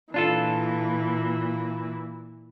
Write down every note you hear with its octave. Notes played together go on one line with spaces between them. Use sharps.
A#2 E3 D4 F4 A4